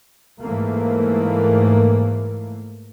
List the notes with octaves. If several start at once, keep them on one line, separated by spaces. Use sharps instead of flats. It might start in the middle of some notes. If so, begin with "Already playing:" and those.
G#2 E3 A3 A#3